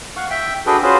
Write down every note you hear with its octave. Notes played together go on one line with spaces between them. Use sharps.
F5 F#5 C#6
E5 G5
D4 F#4 G#4 A4 B4 G5
C#4 F4 F#4 G#4 B4 C5